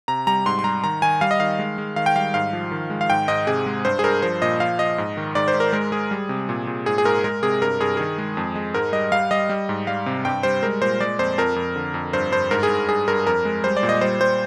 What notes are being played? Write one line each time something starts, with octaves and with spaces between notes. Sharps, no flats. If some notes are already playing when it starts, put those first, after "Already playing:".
C3 A#5
G3 A#5
G#2 C6
C6
G3 A#5
D#3 A#5
D#3 G#5
G3 F5
D#5
D#3 F5
G#3
G#3
D#3 F5
G5
G3 F5
G#2 F5
F3
D#3
G#3
F5
G#2 G5
G#2 D#5
C3 G#4
G#3
G2 C5
G#4
G2 A#4
F3 C5
A#2 D#5
F3 F5
F3 D#5
G#2
D#3
G#2 D5
C5
G#2
A#4
G#3 A#4
G#3 G#4
G3
C3
A#2
A#2
G#2 G#4
G#4
G#2 A#4
G#3 A#4
C3 G#4
G2 A#4
G2 G#4
D#3 G#4
G#3
F2
G#3
G#2 A#4
G3 D#5
G3 F5
G3 D#5
G3
G#2
G3 F5
C3
G2 G5
G3 C5
G#3 A#4
A#2 C5
G#3 D5
F2 C5
F2 A#4
F2
D3
F2
G2 C5
G2 C5
G#2 A#4
G#4
G#2
G2 G#4
G2 A#4
F2 A#4
G#3
G3 C5
D5
A#2
D#5
G3 C5
G3 C5